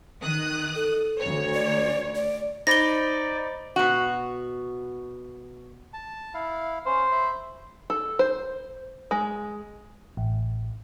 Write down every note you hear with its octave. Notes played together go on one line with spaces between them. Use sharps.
D#3 D#6 F#6
A4
D2 C#5
D5
D5
D#4 C5 D5 B5 A6 A#6 G7
B2 F#4
A5
E4 F5
C#4 C5
E5 B5
A4
C5
G#3
A1